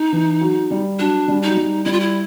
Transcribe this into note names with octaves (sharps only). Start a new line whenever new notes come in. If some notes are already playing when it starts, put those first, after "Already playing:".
Already playing: D#4
E3
F#3
G3
F#3 D4
G3
F#3 D#4
G3
G3 E4
F4
E4